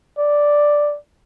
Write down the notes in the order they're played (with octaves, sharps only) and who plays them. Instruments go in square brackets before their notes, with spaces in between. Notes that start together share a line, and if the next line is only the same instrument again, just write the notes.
[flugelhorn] D5